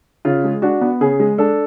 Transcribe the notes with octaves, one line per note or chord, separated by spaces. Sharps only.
C#3 F4
G#3
D4 F#4
B3
C#3 G#4
G#3
D4 A4